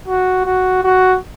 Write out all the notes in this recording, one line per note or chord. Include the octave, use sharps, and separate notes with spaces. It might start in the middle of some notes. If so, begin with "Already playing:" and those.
F#4
F#4
F#4